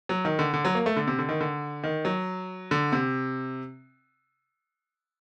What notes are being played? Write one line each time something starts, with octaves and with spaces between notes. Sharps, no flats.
F#3
D#3
D3
D3
F#3
A#3
A3
D3
C3
D3
D#3
D3
D#3
F#3
D3
C3